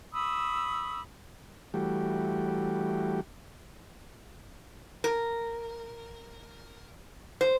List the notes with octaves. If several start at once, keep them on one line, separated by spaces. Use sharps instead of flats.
B5 C#6 D#6 E6
E3 G3 A3 F#4 G4
A#4
C5